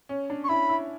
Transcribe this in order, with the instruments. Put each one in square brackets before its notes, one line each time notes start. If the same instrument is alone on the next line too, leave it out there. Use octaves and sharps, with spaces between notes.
[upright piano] C#4
D4
[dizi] C#6
[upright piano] E4 [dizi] B5
[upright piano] E4